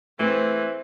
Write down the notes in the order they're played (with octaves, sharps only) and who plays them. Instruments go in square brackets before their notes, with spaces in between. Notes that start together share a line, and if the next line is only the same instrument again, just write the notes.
[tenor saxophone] E3 [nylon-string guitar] A3 G#4 B4 [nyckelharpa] C4